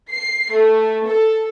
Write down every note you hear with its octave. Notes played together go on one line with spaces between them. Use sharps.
C7
A3
A4